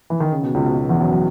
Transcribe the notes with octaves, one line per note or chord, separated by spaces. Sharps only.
E3
D#3
C#3
B2
C#2 C#3
B2
B2
E2 E3
F#2 F#3
F#3